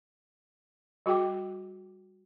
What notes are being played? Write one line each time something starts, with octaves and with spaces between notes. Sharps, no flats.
G3 F#4 G#4 G5 D6